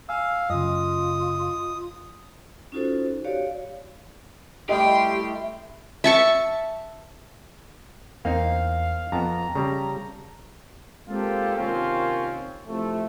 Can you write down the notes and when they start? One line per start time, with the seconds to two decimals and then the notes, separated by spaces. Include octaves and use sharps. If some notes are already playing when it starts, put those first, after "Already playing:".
0.09 F5 G#5 E6
0.50 F#2 C#3 F4 D#5 D#6
2.72 C#4 D#4 F4 F#4 A4 C5
3.24 F#4 G4 C#5 D5 F5
4.69 G3 A3 E4 G4 D#5 G5 C6
6.04 E5 A5 C#6
8.25 E2 A#3 C4 D#4 F5
9.12 F2 B3 A5 A#5
9.55 C#3 G3
11.09 G#3 A#3 C4 F4 G4 A4
11.57 C3 D#3 A#3 C4 C#4 F4
12.68 A2 C3 F3 A3